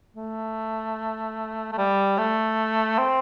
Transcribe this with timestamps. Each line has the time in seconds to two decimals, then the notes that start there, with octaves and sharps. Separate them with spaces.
0.16 A3
1.72 A3
1.78 G3
2.18 A3
2.98 C4